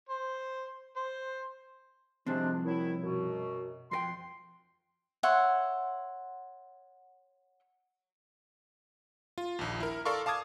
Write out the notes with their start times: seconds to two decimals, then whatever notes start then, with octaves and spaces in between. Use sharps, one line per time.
0.09 C5
0.96 C5
2.26 C2 C3 F3 G#3 C4 D4
2.64 D#3 F#3 E4
3.01 F#2 B2
3.91 F2 A#4 G5 C6
5.23 C#5 E5 F#5 C6
9.38 F4
9.59 A#1 D#2
9.80 E4 A#4
10.05 A4 A#4 D5 F5 C6 C#6
10.26 F5 A5 D6 D#6 G#6